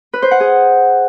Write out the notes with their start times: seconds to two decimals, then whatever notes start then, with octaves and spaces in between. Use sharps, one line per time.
0.13 B4
0.22 C5
0.31 F#5
0.40 G#4